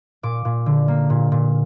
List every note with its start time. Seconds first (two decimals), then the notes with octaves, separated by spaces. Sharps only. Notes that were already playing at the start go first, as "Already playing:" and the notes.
0.23 A#2 D6
0.45 A#2
0.66 D3
0.88 A#3
1.10 A#2
1.32 A#2